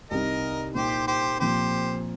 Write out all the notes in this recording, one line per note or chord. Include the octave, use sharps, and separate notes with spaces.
C2 C3 G3 D#4 A#4 D#5
A#2 A#3 D#4 G4 C5
G4 C5
A#2 F3 C4 G4 C5